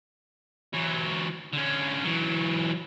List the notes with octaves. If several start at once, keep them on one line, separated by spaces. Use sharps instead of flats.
E3 F#3
D3 C#4
E3 F#3